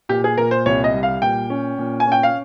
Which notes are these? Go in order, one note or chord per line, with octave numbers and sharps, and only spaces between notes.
A#2 G4
G#4
A#2 A#4
C5
C2 C#5
D#5
G3
F5
A#2 G5
C#4
A#2
G#5
C#4 G5
F5